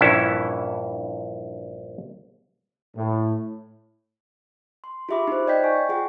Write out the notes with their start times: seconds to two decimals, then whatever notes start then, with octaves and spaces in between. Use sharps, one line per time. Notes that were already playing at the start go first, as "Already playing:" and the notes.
0.01 A#1 G2 E3 C#4 E4 A5
2.95 A2
4.84 C6
5.09 F4 G4 G#4 E5 B5 D6
5.28 D#4 C5
5.47 D5 D#5 G5 G6 B6
5.64 G#5 C#6
5.89 F4 G#4 F#5 G5